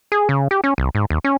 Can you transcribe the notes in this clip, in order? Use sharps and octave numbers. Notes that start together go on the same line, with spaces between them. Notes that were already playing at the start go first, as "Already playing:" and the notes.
G#4
C#3
G4
C#4
C2
G#2
D#2
C#4